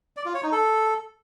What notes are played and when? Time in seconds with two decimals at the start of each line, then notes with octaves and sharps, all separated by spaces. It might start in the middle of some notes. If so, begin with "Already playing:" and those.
0.17 D5
0.25 F4
0.34 C#5
0.43 D#4
0.52 A4